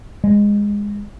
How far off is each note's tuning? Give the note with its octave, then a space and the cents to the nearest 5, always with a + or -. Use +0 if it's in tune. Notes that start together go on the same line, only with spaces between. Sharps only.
G#3 -15